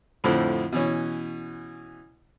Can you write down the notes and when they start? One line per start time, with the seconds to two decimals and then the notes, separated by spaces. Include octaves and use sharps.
0.24 F2 A2 D3 F3 C4 E4
0.72 B2 E3 C#4